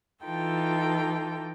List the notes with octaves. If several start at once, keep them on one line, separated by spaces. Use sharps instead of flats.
E3 D#4 F4 A4 G5